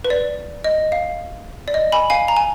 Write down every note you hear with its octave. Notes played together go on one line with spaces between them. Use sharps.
B4
D5
D#5
F5
D5
D#5
G#5 B5
F5 G#5
A#5
G#5